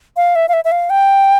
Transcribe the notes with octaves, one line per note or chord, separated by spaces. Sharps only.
F5
E5
F5
E5
E5
F5
G5